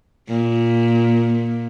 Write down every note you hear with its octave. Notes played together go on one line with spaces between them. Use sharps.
A#2